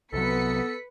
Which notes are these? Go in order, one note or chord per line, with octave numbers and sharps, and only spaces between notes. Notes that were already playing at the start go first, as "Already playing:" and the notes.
C2 C3 F#3 B3 A4 B4 B6 C#7